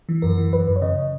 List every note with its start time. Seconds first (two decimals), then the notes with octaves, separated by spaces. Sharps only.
0.09 E3
0.22 F#2 A#4
0.38 E3
0.52 F#2 B4
0.68 F#2
0.76 C#5
0.82 C#3 D#5